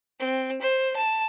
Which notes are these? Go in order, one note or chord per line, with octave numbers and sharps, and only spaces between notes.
C4
C5
A5